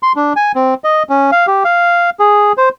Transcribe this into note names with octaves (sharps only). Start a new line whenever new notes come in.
C6
D4
G#5
C4
D#5
C#4
F5
G4
F5
G#4
C5